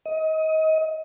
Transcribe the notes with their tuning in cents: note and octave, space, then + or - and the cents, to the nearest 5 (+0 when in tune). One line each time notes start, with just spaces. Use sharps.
D#5 +25